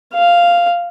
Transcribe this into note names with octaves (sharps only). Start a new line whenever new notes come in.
F5